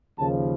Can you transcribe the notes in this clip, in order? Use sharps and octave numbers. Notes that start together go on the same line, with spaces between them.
D#2 C#3 F3 A5